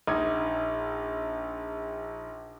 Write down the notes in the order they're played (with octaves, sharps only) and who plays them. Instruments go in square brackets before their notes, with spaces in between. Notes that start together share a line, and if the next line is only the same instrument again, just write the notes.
[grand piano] A#1 D#4 G#6